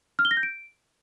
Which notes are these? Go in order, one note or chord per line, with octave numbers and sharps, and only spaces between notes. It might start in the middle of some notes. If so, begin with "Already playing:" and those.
F6
G7
A#6
G6
D7